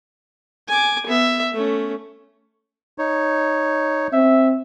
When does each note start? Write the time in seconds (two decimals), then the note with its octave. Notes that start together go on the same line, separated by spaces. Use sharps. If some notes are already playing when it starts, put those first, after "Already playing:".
0.68 G#5 D6
1.07 B3 E5
1.54 A3 C#4
2.98 D#4 C#5
4.13 C4 E5